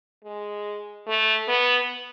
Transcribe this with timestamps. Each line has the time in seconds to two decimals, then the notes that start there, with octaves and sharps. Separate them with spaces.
0.24 G#3
1.08 A3
1.48 B3